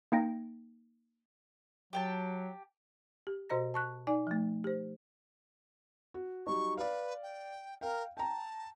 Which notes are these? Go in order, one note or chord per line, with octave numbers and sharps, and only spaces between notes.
A#3 D#4 G5 A#6
F#3 G4 G5 A5
G4
B2 F#4 C5 D#5 A#5 A#6
A5 C#6 F#6
D#4 D5 G#5
F3 A3
G4 C5
F#4
F#3 G3 D#4 C#6
B4 D5 F5
G5
A#4 F5 G5
G5 A5 A#5